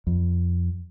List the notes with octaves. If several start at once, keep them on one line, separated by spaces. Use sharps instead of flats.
F2